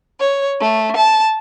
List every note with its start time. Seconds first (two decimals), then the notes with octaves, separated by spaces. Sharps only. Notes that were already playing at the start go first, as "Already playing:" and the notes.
0.19 C#5
0.59 A3
0.96 A5